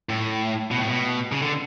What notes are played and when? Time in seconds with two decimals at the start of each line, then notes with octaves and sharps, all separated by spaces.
0.09 A2
0.71 B2
0.78 A2
0.88 B2
1.32 C#3
1.42 D3